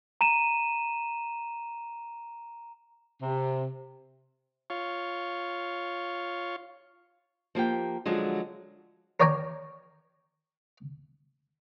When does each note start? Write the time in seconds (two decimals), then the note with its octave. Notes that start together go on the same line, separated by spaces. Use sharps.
0.21 A#5 D#7 E7
3.22 C3
4.70 F4 C#5
7.55 F3 A#3 G4 G5
8.06 D3 F3 F#3 G#3
9.20 A#4 C#5 D5 G5 G#5 A#5